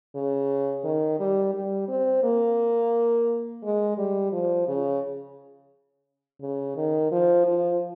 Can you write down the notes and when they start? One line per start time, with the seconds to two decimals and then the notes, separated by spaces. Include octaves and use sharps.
0.15 C#3
0.84 D#3
1.20 G3
1.54 G3
1.88 C4
2.23 A#3
3.63 G#3
3.98 G3
4.32 F3
4.68 C#3
6.41 C#3
6.76 D#3
7.11 F3
7.46 F3